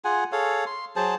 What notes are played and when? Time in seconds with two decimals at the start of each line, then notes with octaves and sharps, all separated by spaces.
0.05 F4 G#4 F#5 G#5
0.32 G#4 A4 C#5 F5
0.66 C6
0.96 F#3 G#4 C5 A5